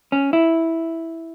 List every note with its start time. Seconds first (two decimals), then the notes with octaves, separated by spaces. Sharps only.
0.12 C#4
0.33 E4